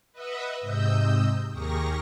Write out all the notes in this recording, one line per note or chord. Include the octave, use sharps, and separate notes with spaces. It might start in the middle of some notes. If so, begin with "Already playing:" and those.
B4 D#5 E5 F#5
G#2 C3 D#5 E6 G6
D#2 G4 G#4 A#4 C#6 A#6